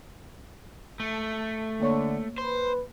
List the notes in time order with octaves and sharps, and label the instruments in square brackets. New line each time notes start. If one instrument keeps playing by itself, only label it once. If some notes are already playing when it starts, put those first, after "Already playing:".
[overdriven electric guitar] A3
[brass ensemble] D3 [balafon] A#3 C#5 C#6
[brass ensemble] B4 [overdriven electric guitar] C5